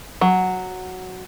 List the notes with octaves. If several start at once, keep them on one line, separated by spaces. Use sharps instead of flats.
F#3